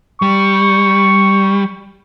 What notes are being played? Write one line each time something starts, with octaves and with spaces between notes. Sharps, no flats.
G3 C#6